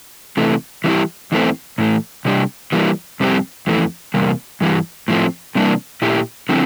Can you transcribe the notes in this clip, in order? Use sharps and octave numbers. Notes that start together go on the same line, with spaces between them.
C3 E3 A3
E3 G3 C4 E4 G4
E2 E3 A3 C4
A2 E3 A3
C3 G3 D4 G4
E3 G3 A#3
F2 C3 G3 C4 G4
F2 E3 A3
E2 C3 G3 A#3
G2 E3 G3
A2 F3 A3 C4
C3 E3 G3 A#3 D4
A#2 A3 E4 G4
D3 F3 C4 E4